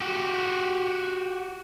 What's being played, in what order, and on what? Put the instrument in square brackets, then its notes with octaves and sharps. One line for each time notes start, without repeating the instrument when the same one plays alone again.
[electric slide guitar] F#4 G4